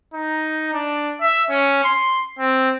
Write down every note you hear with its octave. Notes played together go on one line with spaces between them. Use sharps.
D#4
D4
E5
C#4
C6
C4